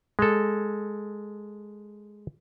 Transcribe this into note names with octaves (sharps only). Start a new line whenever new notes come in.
G#3 A4